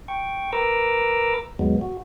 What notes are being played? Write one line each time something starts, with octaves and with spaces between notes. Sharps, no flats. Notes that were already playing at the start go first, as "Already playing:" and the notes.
G5 C#6
A#4 B4 A#5 D6 E6
D#2 G#2 F#3 G#3 B3
F#4